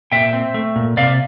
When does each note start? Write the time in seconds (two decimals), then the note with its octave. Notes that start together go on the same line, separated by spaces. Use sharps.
0.12 A#2 E5 G5
0.33 C4
0.54 A3
0.76 A#2
0.97 C3 D5 F5